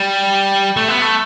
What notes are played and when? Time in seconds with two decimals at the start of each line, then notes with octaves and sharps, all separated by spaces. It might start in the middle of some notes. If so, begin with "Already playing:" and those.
Already playing: G3
0.77 A3
0.88 B3
1.02 A3